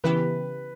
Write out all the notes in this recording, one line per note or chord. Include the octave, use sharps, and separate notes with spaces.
C#3 E3 B3 E4 G4 B4